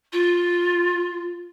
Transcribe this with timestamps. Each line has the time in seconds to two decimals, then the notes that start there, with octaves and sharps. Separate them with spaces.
0.13 F4